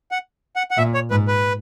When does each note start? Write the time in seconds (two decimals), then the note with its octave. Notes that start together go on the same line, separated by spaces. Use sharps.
0.12 F#5
0.56 F#5
0.71 F#5
0.77 A#2 E5
0.94 C#5
1.11 G#2 B4
1.28 B4